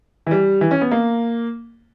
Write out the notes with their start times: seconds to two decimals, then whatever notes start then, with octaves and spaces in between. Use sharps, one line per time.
0.27 E3
0.31 G3
0.61 E3
0.71 C#4
0.81 B3
0.91 A#3